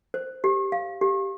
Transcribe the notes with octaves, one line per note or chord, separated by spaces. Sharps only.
C5
G4
F5
G4